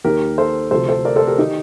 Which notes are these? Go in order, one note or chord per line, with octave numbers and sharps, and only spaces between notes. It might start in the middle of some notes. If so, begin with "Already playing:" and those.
D#2 D#3 G4 A#4
A4 C5
D2 C3 F3 A4 C5
A4 C5
A#4 D5
A4 C5
G4 A#4
D#3 D#4 G4